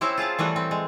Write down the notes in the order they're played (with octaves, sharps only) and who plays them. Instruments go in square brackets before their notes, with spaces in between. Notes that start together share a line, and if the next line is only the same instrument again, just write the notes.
[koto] C4 C#4 E4 G4 C5
F4 G#4 F5 A5
E3 G3 A3 B4
C4
G#3